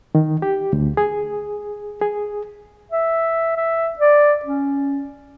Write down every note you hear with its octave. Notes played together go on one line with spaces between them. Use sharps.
D#3
G4
D2
G#4
G#4
E5
E5
D5
C#4